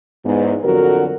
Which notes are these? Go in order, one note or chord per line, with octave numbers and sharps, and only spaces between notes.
E2 G#2
F2 D3 F#3 F#4 A#4